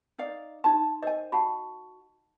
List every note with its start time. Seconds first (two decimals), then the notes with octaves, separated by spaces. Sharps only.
0.18 D#4 D5 F5
0.64 D#4 A5 C6
1.02 A#4 C5 D#5 G#5
1.32 F#4 F#5 A5 B5